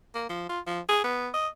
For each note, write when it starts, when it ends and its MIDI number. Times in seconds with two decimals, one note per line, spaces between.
0.15 0.25 58
0.29 0.46 53
0.49 0.60 65
0.67 0.80 53
0.89 1.01 68
1.04 1.28 59
1.34 1.48 75